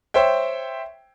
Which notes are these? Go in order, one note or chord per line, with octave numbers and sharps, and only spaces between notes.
C5 C#5 E5 G5